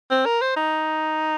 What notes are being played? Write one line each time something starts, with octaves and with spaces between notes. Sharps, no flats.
C4
A#4
C5
D#4